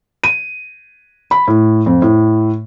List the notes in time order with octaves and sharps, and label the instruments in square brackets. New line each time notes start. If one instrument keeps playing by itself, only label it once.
[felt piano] D#7
B5
A2
F2
A2